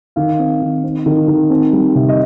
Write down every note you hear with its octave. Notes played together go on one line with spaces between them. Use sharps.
D#3 F5
C4
D#3
C4
D#3
D#3
C4
G3
C3
D#5